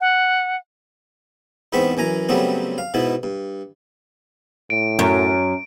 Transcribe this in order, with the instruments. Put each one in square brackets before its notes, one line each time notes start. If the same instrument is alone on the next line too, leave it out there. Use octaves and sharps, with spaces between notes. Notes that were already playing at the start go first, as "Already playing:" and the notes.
[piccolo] F#5
[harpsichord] E2 G#2 B3 C4 B5 C#6
F#2 E3 G#5 A#5
C#3 F#3 G3 A3 B3 C4
F5
G#2 B2 B3 E4
G2
[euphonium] A2 [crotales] D7
[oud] F#2 [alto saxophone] C#4